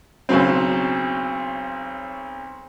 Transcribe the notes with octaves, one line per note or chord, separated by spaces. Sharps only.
B1 C#3 F#3 C4